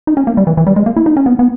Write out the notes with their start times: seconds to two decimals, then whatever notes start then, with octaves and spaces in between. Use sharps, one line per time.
0.07 D#4
0.17 C#4
0.27 A#3
0.37 G3
0.47 E3
0.57 E3
0.67 G3
0.76 G#3
0.86 A#3
0.96 E4
1.06 D#4
1.17 C#4
1.26 B3
1.39 B3